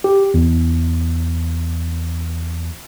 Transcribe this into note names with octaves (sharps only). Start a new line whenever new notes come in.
G4
E2